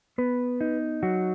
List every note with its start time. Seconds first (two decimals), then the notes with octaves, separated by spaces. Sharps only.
0.18 B3 B4
0.61 D#4
1.03 F#3 F#4